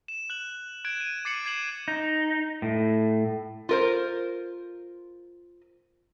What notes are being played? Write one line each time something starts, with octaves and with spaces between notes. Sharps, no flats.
E7
F#6 F#7
F#6 G#6 D7 E7
D#7
D6 A6 C7 C#7 D#7 F#7
G#6 C7 E7 F#7
D#4
A2
F4 A#4 C5